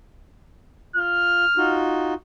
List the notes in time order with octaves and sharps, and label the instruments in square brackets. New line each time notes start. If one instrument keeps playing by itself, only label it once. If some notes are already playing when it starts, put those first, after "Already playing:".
[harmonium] F4 [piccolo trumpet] F6
[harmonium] D#4 F4 F#4